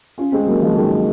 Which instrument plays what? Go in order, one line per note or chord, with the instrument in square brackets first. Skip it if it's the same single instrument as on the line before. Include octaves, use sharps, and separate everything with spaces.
[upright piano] C#4 F4
G#3 C4
F#3 A#3
F3 G#3
F3
D#3 F#3